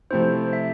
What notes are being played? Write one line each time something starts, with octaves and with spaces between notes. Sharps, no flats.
C3 F3 A3 C4 E4 C5
E5